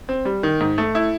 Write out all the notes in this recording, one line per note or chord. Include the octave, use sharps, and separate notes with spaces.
C4
G3
D#3
G#2
A3
E4